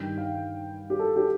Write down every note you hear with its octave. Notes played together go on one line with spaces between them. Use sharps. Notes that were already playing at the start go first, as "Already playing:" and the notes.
Already playing: G2 D#3 G3 G5
F5
G4
A4
G4